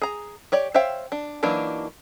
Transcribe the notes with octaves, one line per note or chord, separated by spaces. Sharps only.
G#4 A#5
G4 C#5 D5
C5 C#5 E5 F5 G5
D4
E3 F#3 A#3 D4 D#4